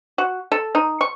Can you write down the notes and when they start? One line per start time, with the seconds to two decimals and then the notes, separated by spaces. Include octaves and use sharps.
0.18 F#4
0.52 A4
0.75 D#4
1.01 C#6